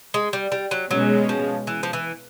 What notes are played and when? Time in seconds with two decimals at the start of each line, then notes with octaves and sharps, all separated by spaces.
0.14 G#3
0.33 G3
0.52 G3
0.71 F#3
0.90 B2 F#3 G#3 C#4
1.29 F3
1.67 E3
1.83 F3
1.93 E3